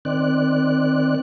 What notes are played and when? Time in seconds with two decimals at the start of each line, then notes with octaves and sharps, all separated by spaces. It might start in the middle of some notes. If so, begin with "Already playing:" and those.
0.05 D#3 C4 D5 F#6